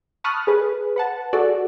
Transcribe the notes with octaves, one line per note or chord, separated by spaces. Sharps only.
A5 B5 C#6 D#6 F6 F#6
G#4 B4
B4 F#5 A5
F#4 G#4 A4 D5